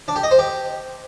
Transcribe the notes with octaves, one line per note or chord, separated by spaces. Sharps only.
D4
G4
D#5
C5
G4